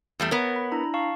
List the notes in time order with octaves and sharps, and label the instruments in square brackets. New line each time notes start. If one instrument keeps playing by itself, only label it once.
[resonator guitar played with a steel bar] E2 G3 A3
[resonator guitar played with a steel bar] B3 A#4 [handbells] C#5 F#5
[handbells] B5
D4 E4 A#5
F5 A5 C#6